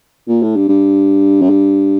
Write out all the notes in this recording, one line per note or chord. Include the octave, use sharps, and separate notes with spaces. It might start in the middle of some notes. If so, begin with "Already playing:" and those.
A#2
A2
G2
G2
F#2
G2